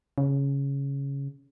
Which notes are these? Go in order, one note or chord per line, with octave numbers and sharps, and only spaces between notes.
C#3